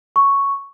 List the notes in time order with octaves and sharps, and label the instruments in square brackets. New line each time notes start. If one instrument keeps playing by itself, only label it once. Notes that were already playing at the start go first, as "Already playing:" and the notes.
[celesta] C#6